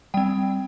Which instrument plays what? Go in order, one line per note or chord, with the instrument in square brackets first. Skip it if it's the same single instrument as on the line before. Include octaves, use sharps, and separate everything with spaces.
[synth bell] G3 C4 G5